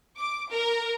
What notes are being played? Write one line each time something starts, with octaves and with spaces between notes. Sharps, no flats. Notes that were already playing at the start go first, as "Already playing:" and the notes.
D6
A#4